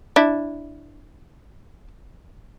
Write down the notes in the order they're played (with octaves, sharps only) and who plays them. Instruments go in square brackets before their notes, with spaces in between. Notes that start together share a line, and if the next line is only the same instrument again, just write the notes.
[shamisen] D4 E4